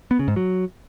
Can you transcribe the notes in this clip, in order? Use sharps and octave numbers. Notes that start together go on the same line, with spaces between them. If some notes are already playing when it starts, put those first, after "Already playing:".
B3
C#3
G#2
F#3